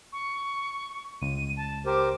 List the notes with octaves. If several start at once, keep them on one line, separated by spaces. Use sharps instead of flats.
C#6
C#2 D#7
A5
G4 A#4 C5 D6